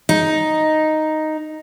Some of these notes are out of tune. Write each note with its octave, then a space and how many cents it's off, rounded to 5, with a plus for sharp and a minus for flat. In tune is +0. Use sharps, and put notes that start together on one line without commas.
D#4 +0